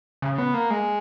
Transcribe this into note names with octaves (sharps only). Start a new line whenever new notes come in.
C#3
B3
A#3
G#3